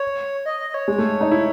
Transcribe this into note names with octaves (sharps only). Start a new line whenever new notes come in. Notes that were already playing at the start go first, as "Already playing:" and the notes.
Already playing: C#5
D#5
D#5
D#5
C#5
G#3
A3
D#4
E4